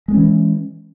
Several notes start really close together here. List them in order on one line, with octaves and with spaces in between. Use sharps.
G#3 A3 C#4 E3